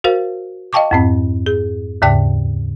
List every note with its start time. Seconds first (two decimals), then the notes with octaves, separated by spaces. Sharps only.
0.04 F#4 A#4 C5 F5
0.73 D#5 F5 G5 A5 C#6 D6
0.91 F2 G#2 C4
1.46 G#4
2.02 D#2 G#2 C#3 D5 G5 F#6